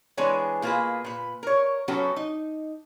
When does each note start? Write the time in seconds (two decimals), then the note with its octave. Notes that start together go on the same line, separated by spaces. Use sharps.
0.17 E3 G#3 B3 D4 G#4 C#5
0.62 B2 A#3 F4 G4 G#4 B4
1.04 A#2 B4
1.43 A#4 C#5
1.88 F#3 B3 C#4 F#4 G4 A4
2.16 D#4